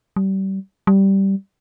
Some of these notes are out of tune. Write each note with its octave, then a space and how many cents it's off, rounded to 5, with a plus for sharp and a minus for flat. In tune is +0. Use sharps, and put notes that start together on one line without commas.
G3 -30
G3 -10